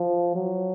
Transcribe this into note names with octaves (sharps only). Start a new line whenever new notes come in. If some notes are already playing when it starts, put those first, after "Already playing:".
Already playing: F3
F#3